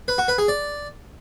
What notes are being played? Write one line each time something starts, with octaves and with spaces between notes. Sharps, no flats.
B4
F#4
B4
G#4
D5